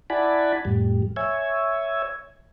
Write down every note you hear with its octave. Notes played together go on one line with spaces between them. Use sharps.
E4 D5 F#5 G#5 A5 B5
F2 A2 G3
C#5 E5 G#5